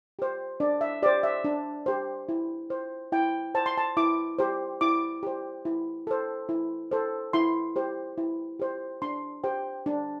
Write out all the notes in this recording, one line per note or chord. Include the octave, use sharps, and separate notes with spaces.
G4 C5
D4 D5
E5
G4 C5 D5
E5
D4
G4 C5
E4
C5
E4 G5
C5 A5
C6
A5
E4 D6
G4 C5
E4 D6
G4 C5
E4
A4 C5
E4
A4 C5
E4 C6
G4 C5
E4
G4 C5
D4 C6
G4 C5 G5
D4